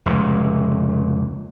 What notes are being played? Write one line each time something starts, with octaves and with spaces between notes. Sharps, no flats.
F1 C#2 A#2